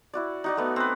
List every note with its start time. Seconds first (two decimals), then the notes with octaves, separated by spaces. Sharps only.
0.13 E4 F#4 D5
0.44 D#4 F#4 D5
0.57 A3 B3
0.76 C4 B4